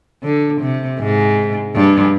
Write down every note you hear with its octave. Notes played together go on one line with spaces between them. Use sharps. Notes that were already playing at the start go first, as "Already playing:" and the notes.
D3
C3
G#2
G2